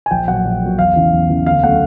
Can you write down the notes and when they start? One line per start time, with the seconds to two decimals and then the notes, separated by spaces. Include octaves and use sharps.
0.06 G#5
0.11 A#1 G5
0.28 A#2 F#3 F#5
0.45 A#1
0.62 A#2 F#3
0.79 E2 F5
0.96 C#3 E3
1.13 E2
1.30 C#3 E3
1.46 D2 F5
1.63 C#3 F#3 A3 F#5